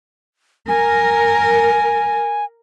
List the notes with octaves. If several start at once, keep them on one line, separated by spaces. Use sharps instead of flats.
A#4 G#5